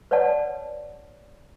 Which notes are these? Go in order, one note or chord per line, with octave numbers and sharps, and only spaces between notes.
B4 C#5 D5 F#5 A5